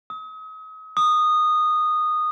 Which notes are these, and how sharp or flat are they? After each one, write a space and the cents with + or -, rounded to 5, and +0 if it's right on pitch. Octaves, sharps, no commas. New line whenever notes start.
D#6 +40
D#6 -15